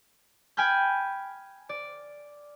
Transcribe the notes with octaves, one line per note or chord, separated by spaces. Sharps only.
G5 G#5 B5 F6 G6
D5